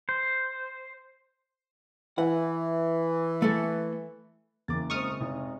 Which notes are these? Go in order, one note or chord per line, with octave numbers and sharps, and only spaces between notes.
C5
E3 F#5
A3 A4
F#1 E2 C#3 A#3 D6 A6
G#3 C4 C#6 D#6 F6
F1 D#4